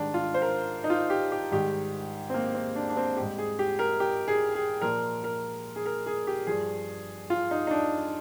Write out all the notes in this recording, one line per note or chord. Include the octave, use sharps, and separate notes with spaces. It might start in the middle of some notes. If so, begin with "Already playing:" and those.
Already playing: G#2 D#3 G3 D4
F4
C5
A#4
D#4
F4
G4
G4
G#2 D#3 G3 G4
C4
A#3
C4
D4
D4
C4
G#2 G3 G4
G#4
G4
A#4
G4
G#4
G#4
A#2 F3 A#4
A#4
G#4
A#4
G#4
G4
G2 F3 G#4
F4
D#4
D#4
D4